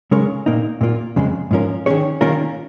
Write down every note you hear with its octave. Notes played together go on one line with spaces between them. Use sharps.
C#3 G#3 C#4 A#4 C#5
A#2 A#3 D#4
A#2 A#3 F4
F2 C#3 G#3
G#2 F3 C#4 A#4
D#3 C#4 G#4 C#5
D#3 A#3 C#4 F4 A#4